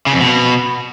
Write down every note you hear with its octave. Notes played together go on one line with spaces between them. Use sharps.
C#3
F2
B2